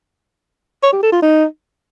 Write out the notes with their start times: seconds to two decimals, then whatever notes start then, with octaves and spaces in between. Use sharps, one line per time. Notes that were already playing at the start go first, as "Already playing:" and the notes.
0.83 C#5
0.93 G4
1.02 A4
1.12 F4
1.22 D#4